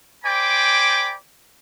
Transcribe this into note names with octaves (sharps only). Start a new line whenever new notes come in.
C5 D5 G5 G#5 B5 D6